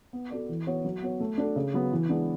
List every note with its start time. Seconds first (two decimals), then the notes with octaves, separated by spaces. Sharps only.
0.13 B3
0.31 F#4 A4 D5
0.49 E3
0.67 B3 F#4 C#5
0.85 F#3
1.02 B3 F#4 C#5
1.20 A3
1.38 D4 F#4 A4
1.56 C#3
1.74 F#3 B3
1.92 E3
2.09 G#3 B3 D4